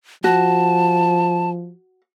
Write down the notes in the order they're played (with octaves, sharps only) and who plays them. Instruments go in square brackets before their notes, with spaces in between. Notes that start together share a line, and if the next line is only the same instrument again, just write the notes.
[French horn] F3 [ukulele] F#4 [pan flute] A5